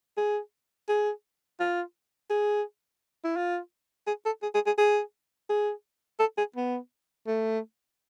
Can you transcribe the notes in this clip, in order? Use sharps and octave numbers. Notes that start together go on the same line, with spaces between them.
G#4
G#4
F4
G#4
E4
F4
G#4
A4
G#4
G#4
G#4
G#4
G#4
A4
G#4
B3
A3